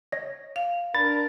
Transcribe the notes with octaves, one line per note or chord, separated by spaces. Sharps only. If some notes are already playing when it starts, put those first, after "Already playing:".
C#5 D#5 A#6
F5
D4 A#4 B5 A6